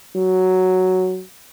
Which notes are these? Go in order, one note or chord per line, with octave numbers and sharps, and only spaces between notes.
F#3